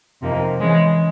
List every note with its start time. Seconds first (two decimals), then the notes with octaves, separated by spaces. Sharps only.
0.21 F2 C3 F3 A#3 D#4
0.60 E3 G#3 C#4